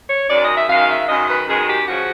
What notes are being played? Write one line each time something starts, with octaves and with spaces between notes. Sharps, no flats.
C#5
F#2 D#3 G#3 D5
D#5
E5
F#2 D#3 G#3 F5
E5
F#2 D#3 G#3 D#5
B4
F#2 D#3 G#3 G#4
G4
C#3 F3 F#4